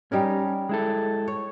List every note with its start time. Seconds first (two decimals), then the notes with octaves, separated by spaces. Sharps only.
0.12 G3 C#4 D#4 A#4
0.69 G#3 E4 A4
1.28 C#5